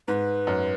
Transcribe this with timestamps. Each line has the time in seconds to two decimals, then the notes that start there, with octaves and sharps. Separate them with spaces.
0.08 G#2 B4
0.47 F#2